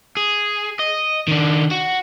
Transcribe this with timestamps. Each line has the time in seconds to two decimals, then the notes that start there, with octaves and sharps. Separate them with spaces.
0.17 G#4
0.79 D#5
1.28 D#3 D4
1.71 F#4